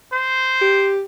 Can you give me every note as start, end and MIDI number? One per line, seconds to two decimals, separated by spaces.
0.13 0.89 72
0.62 1.03 67